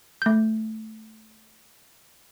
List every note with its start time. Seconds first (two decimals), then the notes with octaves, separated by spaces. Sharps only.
0.22 A3 G6